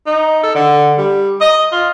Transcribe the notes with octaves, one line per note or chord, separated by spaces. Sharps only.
D#4
A4
D3
G3
D#5
F4